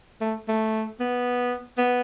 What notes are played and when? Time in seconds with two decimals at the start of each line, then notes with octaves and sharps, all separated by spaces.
0.20 A3
0.48 A3
1.00 B3
1.78 B3